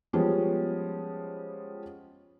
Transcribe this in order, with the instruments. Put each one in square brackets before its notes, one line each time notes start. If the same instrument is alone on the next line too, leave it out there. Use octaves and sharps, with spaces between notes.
[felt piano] F3 G3 G#3 B3 C#4